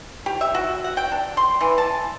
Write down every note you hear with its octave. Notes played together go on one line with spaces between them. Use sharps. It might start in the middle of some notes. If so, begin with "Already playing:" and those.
G4
E5
F#4
F#5
G5
D4
C6
E3
A5